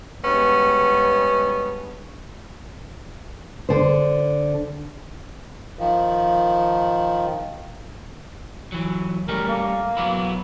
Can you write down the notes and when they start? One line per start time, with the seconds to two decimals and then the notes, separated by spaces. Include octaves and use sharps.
0.23 G2 G#3 B3 C#4
3.69 D3 C5
5.79 D#3 F3
8.72 E3 F#3
9.28 G3 A3 C#4 A#4
9.48 A#3
9.97 F#3 B3 E4